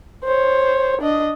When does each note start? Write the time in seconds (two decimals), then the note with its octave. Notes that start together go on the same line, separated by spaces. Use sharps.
0.24 C5 C#5
1.01 D4 D#5